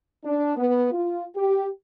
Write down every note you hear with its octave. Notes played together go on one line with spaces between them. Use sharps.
D4
B3
F4
G4